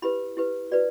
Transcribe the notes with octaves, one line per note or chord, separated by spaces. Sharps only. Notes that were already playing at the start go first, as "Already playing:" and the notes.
E4 G4 B4 B5
E4 G4 B4
F#4 B4 D5